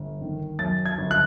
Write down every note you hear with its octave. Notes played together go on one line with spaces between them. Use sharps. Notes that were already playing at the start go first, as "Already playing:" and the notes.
Already playing: G1
D#3
F#2 A6
G#6
G1
F#6